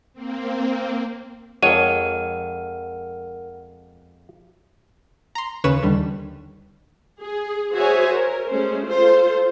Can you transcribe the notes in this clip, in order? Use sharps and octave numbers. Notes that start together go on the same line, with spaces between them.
A#3 C4
F2 G#3 A#4 C#5 F#5 D#7
A#5 C6
D#2 C#3 C#4 B4 C#5 E7
D#2 D3 G3
G#4
F#4 G#4 C5 C#5 E5 G#5
A#4
G#3 A3 C#4 C5
F4 A4 C5